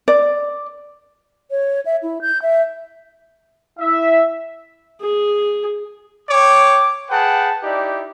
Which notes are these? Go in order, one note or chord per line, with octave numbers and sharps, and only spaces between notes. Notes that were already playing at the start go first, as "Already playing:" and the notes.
D5
C#5
E5
E4
G6
E5
E4 E5
G#4
C#5 G5 D6
G#4 B4 F#5 G5 A5
D#4 E4 G4 D5